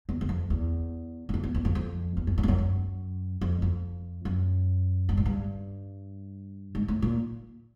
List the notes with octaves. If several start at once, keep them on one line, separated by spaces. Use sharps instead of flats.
E2
E2
F2
E2
E2
F2
E2
E2
F2
F2
E2
F#2
F#2
F2
F#2
F#2
F2
F2
F#2
G2
G#2
G2
G#2
A2
A#2